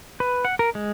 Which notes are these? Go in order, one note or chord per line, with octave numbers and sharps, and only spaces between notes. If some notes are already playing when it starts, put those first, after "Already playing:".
B4
F#5
A#4
G#3